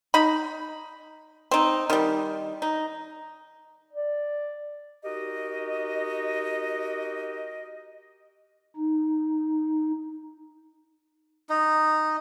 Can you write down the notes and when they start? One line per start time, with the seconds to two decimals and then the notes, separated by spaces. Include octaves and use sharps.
0.14 D#4 B5
1.51 C4 D#4
1.90 D#3 G3
2.62 D#4
3.93 D5
5.04 D#4 F#4 G4 A#4 D#5
8.76 D#4
11.49 D#4